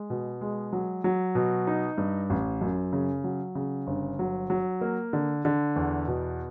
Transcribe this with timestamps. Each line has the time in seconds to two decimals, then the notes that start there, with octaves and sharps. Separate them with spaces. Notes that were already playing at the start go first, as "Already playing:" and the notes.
Already playing: G#3
0.10 B2
0.41 G#3
0.73 F#3
1.04 F#3
1.35 B2
1.67 D#4
1.98 G2
2.30 A1
2.61 F#2
2.93 C#3
3.24 F#3
3.55 C#3
3.87 G1
4.19 F#3
4.50 F#3
4.81 A#3
5.13 D3
5.45 D3
5.76 E2
6.07 B2